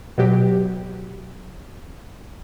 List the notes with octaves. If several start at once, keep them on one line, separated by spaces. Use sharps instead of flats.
B2 F#3 G4